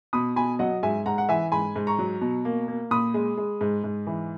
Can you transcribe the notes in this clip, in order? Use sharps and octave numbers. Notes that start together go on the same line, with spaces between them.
B2 B5 D#6
B2 G#5 B5
F#3 D#5 F#5
G#2 E5 G#5
G#2 F#5 A#5
F#5
E3 E5 G#5
G#2 G#5 B5
G#2
A#5 C#6
F#3
B2
A#3
A#3
A#2 B5 D#6
G#3
G#3
G#2
G#2
E3